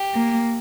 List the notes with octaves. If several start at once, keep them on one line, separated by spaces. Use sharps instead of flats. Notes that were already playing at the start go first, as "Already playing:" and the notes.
Already playing: G4
A#3